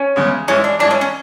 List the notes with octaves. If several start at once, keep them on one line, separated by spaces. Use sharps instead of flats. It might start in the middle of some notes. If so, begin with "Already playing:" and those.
Already playing: C#4
E2 C#3 G#3
G#2 E3 G#3 C#4
D4
G#2 E3 G#3 D4
C#4
C#4